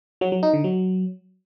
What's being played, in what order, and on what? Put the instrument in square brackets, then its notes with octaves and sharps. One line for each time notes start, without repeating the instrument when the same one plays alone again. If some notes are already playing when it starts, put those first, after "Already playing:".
[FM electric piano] F#3
F#3
D#4
D3
F#3